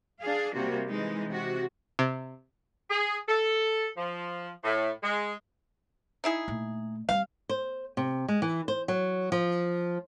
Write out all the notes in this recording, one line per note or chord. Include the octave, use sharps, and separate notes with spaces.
D4 G#4 F5
C3 G3 A#3 F#4
E3 G#3 D#4
C3 F#4
C3
G#4
A4
F3
A2
G#3
D#4 E4 G#4
A#2 A3
G3 C4 F5
C5
C3
G#3
E3
C5
F#3
F3